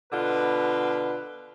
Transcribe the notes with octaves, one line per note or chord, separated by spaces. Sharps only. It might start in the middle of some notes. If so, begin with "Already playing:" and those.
B2 D3 F4 B4